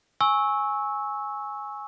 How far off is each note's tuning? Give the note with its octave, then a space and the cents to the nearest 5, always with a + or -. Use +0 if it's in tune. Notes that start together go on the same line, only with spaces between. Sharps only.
G#5 +0 C#6 -15 E6 -20